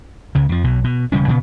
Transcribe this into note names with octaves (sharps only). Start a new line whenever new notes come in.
C#2 C#3
F2 F3
B1 B2
B2
E1 C#3 G3 C#4
A#2 C#3 B3